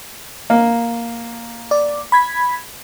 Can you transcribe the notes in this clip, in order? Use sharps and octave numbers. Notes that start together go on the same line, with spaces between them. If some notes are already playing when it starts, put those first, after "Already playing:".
A#3
D5
B5 G#6 B6